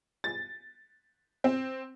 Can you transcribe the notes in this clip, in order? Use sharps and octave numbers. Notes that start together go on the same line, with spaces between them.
A6
C4